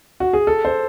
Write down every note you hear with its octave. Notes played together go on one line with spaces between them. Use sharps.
F#4
G#4
A4
C5